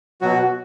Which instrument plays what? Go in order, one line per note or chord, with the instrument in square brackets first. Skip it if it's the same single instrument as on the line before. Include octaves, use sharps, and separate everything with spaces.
[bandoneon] B2 F#3 F#4